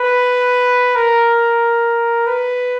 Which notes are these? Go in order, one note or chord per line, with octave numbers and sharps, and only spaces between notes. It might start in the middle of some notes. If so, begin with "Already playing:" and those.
Already playing: B4
A#4
B4